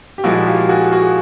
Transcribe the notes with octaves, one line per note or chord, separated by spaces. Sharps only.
G4
A#2 F3 G#3 E4 F#4
F4 G4
F#4 G#4
F#4 G#4